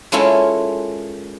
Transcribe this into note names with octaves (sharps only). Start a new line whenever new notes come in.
G#3 A#3 C#4 E4 F4 A4